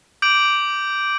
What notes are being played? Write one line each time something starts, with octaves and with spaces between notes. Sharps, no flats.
D6 G6 D7 F#7